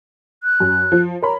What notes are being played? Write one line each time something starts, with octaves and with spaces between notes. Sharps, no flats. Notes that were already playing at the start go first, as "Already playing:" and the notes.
F#6
F#2
F3
A#4 C#5 A#5 B5